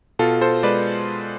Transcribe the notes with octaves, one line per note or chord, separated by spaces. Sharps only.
B2 F4 A4
A4 C5
G#3 B4 D5